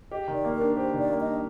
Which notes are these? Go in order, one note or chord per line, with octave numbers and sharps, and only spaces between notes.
G4 D#5
D#3
D5
A#3
A#4
D4
G4 C5
D#3 D5
A#3
D#5
D4